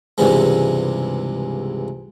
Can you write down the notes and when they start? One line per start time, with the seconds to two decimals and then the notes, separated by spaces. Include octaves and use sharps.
0.18 C#2 G2 C3 E3 G#3